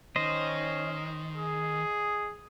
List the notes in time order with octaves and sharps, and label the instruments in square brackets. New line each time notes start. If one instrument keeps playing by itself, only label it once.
[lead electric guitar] D#3 [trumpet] C#4 [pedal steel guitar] C5 D#5
[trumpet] G#4